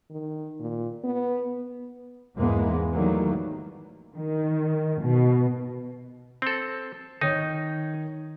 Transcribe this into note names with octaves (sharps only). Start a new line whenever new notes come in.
D#3
A#2
B3
E2 G#2 E3 G#3 A#3 B3
D#3 E3 F#3 G3 A3 A#3
D#3
B2
C4 A4
D#3 D#4 C#5